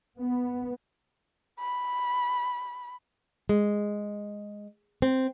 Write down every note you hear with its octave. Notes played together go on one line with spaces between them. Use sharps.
B3
B5
G#3
C4